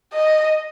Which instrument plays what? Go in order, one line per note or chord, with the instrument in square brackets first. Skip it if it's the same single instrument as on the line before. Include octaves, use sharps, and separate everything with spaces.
[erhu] D#5